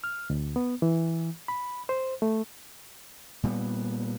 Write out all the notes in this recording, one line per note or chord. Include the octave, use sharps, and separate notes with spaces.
F6
D2
B3
E3
B5
C5
A3
A#2 G3 G#3 B3